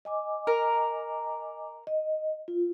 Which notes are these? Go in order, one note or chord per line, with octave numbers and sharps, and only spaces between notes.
D#5 G#5 D6
A#4
D#5
F4